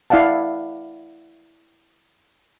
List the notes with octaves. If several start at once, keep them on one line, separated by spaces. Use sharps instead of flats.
E4 D5 F5 F#5 A5